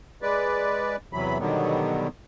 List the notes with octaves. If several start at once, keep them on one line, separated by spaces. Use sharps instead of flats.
G#3 B4 D5
E2 C3 E3 F#3 B5
B2 D3 D#3 F#3 G3 B3